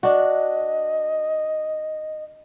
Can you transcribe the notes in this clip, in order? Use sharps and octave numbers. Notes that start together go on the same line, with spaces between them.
D4 F#4 D#5